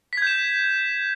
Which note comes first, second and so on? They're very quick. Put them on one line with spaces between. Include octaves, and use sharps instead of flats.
B6 G#6 G6 E7